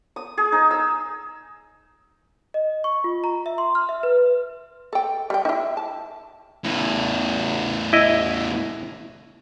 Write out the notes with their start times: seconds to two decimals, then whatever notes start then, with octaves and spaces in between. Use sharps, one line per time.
0.16 D#6
0.37 G#4
0.52 D#4
0.71 E6
2.54 D#5
2.84 C#6
3.04 F4
3.24 A#5
3.46 E5
3.58 C6
3.75 F6
3.89 E5
4.03 B4
4.93 A4 G5
5.30 G3 G5
5.45 D#4 E4
5.77 A5
6.64 E2 A2
7.93 E4 D#5